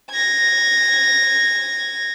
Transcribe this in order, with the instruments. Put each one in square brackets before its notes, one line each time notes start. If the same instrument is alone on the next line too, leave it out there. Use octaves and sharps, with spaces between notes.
[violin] G#6 A#6